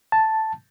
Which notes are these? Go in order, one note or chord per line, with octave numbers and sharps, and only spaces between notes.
A5